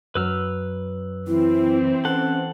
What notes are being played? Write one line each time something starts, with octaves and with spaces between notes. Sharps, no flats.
F#2 F#3 B4 E6 F6
E3 C4 E4
C#4 A4 F#5